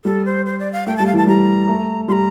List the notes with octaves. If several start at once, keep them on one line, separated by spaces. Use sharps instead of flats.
G3 A4
C5
C5
D5
F5
A3 G5
G3 A5
F5
E3 A5
G3 A#5
A3
G3 A#5 C6